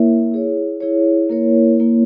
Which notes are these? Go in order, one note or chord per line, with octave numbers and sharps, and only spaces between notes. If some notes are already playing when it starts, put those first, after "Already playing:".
Already playing: A#3 E4 A#4 C#5 E5
E4 G#4 C#5
E4 G#4 C#5
A#3 E4 A#4 C#5
A#3 E4 A#4 C#5